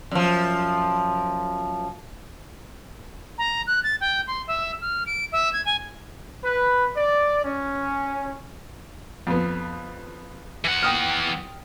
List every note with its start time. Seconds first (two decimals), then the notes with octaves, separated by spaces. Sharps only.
0.11 F#2 F3
3.38 A#5
3.67 F#6
3.84 A6
4.01 G5
4.27 C6
4.47 E5
4.82 F6
5.06 D7
5.32 E5
5.53 G#6
5.66 G#5
6.43 B4
6.95 D5
7.44 C#4
9.27 F2 B3
10.64 E3 F#5
10.83 G5 D#6 F6